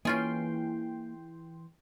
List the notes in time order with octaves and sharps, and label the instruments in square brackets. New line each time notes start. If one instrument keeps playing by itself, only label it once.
[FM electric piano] E3 G5 C6 [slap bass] A#3 [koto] C#4 F4 G#4